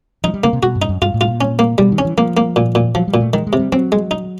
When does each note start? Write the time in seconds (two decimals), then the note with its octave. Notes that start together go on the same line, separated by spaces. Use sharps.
0.24 F3 D#4
0.34 G3
0.44 C#3 A#3
0.53 C3
0.63 B2 F#4
0.75 G2
0.82 D#4
0.89 F#2
1.02 G2 F4
1.14 A2
1.21 F4
1.28 A#2
1.41 C#4
1.59 A#3
1.78 B2 G3
1.92 D#3
1.98 C#4
2.05 E3
2.18 F3 A#3
2.37 A#3
2.56 A#2
2.75 A#2
2.95 F3 F#3
3.08 G3
3.14 A#2
3.20 A3
3.33 D#3 G#3
3.47 G#3
3.53 C3
3.59 G3
3.72 F#3 C4
3.92 G#3
4.11 D#4